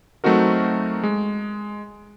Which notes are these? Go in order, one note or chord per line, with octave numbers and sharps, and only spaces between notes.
F#3 A3 C4 D#4 F#4 A#4
G#3